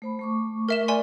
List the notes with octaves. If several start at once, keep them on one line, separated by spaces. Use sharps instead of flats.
A3 C5 B5
A3 C#6 D6
A#4 E5 E7
D5 G#5 C6